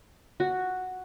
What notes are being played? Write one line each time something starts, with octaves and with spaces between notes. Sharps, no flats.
F#4